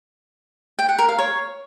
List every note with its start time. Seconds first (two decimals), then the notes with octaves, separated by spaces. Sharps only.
0.79 G5
0.89 F#5
0.99 A#4
1.09 F5
1.18 C#5